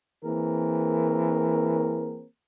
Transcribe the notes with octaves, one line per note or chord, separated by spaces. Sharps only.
E3 A#3 C4 G#4 A#4